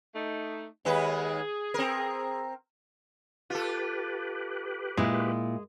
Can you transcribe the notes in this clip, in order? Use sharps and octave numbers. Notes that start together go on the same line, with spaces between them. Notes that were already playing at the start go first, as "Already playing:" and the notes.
A3 D#4
D#2 G#3 G#4 B4
C4 A#4
F4 G4 A4 B4
A#2 G#3 E4